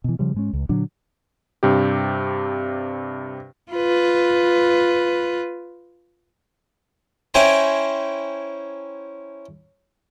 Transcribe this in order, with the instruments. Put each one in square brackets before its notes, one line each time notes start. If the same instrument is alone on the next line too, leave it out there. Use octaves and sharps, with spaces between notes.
[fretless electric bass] B2 E3
C#3 F3 G3
G#2 G#3 C#4
C#2
A#2 D3 F#3 D4
[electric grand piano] G2 C3 G4
[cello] F4 B4
[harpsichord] C#4 E4 C5 G5 G#5 A#5